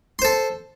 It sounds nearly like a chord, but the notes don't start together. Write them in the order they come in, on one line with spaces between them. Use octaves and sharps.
C6 C5 A4